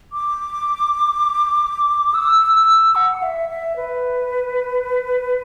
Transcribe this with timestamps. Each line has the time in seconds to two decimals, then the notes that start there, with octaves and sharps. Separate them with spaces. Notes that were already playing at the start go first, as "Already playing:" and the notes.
0.13 D6
2.14 E6
2.55 E6
2.95 F#5
3.23 E5
3.49 E5
3.76 B4